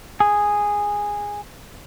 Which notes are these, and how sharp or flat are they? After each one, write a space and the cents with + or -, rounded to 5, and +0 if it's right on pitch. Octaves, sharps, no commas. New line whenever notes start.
G#4 -10